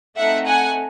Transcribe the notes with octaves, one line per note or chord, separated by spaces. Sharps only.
A3 C4 D#4 E5 F#5
F#5 G#5